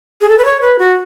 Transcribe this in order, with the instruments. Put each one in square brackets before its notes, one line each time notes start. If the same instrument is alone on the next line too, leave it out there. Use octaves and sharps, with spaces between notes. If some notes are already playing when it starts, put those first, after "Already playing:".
[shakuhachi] G#4
A4
B4
C#5
B4
F#4